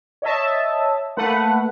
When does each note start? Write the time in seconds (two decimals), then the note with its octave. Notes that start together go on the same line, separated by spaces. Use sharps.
0.22 C#5 D#5 E5 A5
1.17 A3 A#3 B4 F#5